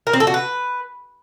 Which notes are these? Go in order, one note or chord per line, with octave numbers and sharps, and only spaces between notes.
A#4
C4
A4
F#4
B4